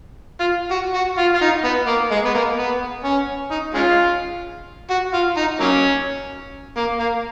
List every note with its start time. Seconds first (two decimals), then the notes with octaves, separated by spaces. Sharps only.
0.40 F4
0.71 F#4
0.94 F#4
1.18 F4
1.35 F4
1.41 D#4
1.64 B3
1.88 A#3
2.11 G#3
2.25 B3
2.35 A#3
2.57 B3
3.04 C#4
3.51 D#4
3.74 G#3 C#4 F4
4.90 F#4
5.14 F4
5.37 D#4
5.60 F#3 A#3 C#4
6.77 A#3
6.99 A#3